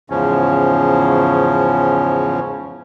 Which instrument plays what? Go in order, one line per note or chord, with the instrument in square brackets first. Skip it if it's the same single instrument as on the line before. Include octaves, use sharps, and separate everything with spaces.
[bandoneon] E2 G#2 C#3 F3 C#4